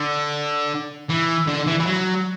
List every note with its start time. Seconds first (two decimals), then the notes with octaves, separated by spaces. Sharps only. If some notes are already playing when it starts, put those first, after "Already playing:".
Already playing: D3
1.10 E3
1.48 D3
1.67 E3
1.80 E3
1.86 F#3